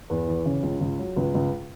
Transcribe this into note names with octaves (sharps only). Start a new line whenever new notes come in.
E2 B4
E3
C#3
C#2
C#2
F#3
C#2 B4
C#2